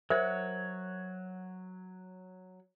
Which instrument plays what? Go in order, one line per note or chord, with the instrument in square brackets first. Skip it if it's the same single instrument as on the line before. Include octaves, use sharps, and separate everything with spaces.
[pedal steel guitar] F#3 C#5 F#5 [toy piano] A#4 C5 E5